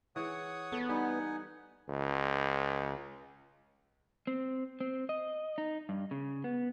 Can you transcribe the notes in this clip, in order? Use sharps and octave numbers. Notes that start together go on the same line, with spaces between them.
E3 G#4 C#5 F#5 D#6
B3 A4
G3 D#4 F#5 G#5
C#2
C4
C4
D#5
D#4
G2
C#3
B3